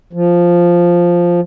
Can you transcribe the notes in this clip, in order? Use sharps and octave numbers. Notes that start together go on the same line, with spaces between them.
F3